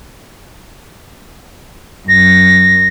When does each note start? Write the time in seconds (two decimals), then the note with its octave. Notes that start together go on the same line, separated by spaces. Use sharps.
2.08 F#2 A#6